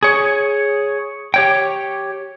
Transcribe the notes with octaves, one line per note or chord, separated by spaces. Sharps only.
G#4 C#5
G4 C#5 G5